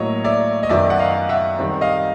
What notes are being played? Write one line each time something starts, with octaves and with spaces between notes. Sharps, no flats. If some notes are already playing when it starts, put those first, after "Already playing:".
Already playing: A2 F#3 A#3 C#5 D#5
D5 E5
D#5
F#2 D#3 F#3 B3 D5 E5
F#5
D#5 F5
E5 F#5
D#3 G3 C4
D#5 F5